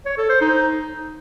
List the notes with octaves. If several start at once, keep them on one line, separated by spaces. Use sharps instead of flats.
C#5
A4
C5
D#4